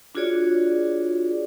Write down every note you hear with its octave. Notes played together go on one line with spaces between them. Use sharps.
D4 F4 F#4 G#4 C#5 D5